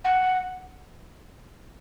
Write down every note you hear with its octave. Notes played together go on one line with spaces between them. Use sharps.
F#5